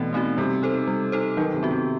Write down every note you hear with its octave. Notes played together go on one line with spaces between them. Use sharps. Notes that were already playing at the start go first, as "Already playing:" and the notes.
Already playing: B2 E3 A3 C4 D#4 F#4
A3 C4 D#4 F#4
C3 G3
D#4 A4 C5
G3
D#4 A4 C5
D#3 F#3
C3
B3 F#4
C3